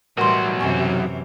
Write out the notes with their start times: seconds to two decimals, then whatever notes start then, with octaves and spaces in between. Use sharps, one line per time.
0.17 B1 A2 E3 G3 F#4 A#4 C6
0.59 F#2 C3 E3 G#5 C#6